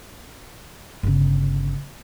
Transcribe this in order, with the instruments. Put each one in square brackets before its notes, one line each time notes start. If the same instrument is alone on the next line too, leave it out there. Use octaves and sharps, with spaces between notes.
[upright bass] G1 C#3